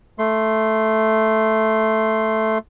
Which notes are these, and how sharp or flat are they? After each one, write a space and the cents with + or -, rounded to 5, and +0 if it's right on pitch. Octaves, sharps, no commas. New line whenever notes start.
A3 +0 C6 +0